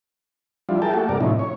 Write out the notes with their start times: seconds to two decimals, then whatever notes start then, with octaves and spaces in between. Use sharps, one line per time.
0.69 F3 G3 D4 E4 F4
0.82 E4 G#4 A#4 G5 A5
0.94 A3 A#3 F#4 G4 A4
1.09 G2 C3 A#4 D5
1.21 A2 C3 F3 C#4 D#4 E4
1.39 C#5